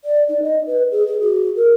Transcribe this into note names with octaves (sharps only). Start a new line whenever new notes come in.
D5
D#4
D#5
B4
G#4
G#4
F#4
A#4